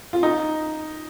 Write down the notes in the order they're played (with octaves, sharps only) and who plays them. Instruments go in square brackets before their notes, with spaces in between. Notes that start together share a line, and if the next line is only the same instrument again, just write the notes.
[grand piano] F4
D#4